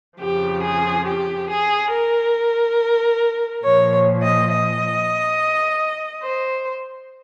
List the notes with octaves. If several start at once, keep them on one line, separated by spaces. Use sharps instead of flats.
F2 C#3 F3 G4
G#4
G4
G#4
A#4
A#2 F3 C#5
D#5
D#5
C5